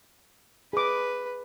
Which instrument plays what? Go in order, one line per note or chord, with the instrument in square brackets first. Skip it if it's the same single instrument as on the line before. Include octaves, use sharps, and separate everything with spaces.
[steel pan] G#4 D6 [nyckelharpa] B4